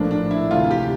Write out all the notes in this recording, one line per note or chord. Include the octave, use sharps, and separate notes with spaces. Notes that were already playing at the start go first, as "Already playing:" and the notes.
Already playing: A#1 A2 F3 A#3 D4
D4
E4
D2 C3 E3 F4
G4